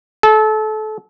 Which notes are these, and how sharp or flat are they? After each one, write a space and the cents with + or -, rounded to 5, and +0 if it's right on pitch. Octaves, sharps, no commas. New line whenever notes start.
A4 -25